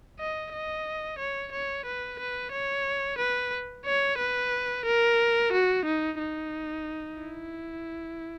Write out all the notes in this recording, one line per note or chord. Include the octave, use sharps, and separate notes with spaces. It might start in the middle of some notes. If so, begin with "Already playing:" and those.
D#5
D#5
C#5
C#5
B4
B4
C#5
B4
C#5
B4
A#4
F#4
D#4
D#4
E4